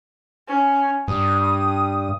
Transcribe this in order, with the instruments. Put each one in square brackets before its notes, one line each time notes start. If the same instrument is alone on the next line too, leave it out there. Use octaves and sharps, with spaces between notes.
[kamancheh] C#4
[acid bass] G2 [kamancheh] D#6